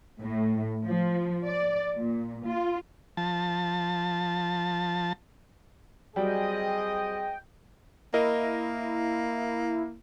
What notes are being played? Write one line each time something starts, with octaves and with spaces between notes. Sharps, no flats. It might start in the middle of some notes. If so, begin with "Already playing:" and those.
A2
F3
D5
A#2
F4
F3 A5
F#3 G3 C4 G#4 D#5 G5
A#3 E4 A#4 D#5